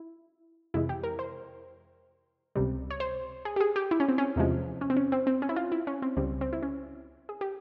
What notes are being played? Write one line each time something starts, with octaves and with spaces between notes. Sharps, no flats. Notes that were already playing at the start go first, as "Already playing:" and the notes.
Already playing: E4
F2 C3 E3 G#3 E4
G4
A#4
C5
C#2 C3 G3
C#5
C5
G#4
G4
G#4
G4
E4
C#4
C4
C#4
E2 C3 F3 G#3
C#4
C4
C#4
C4
C4
C#4
E4
F4
E4
C#4
C4
C#2 C#3 G3 C4
C4
E4
C#4
G#4
G4